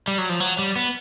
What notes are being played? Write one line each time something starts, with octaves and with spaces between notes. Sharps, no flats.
G3
F#3
F3
F#3
G3
B3